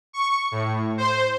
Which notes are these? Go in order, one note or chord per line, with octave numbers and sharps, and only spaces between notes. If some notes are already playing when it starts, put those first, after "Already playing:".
C#6
A2
C5